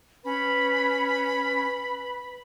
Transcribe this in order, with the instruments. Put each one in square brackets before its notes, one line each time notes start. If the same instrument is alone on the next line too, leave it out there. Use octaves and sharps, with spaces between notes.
[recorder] C#4 [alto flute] B4 [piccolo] B5